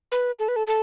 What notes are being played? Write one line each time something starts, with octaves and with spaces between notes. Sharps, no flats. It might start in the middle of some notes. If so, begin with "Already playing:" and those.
B4
A4
B4
A4
A4